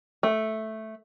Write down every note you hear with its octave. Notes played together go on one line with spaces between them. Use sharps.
A3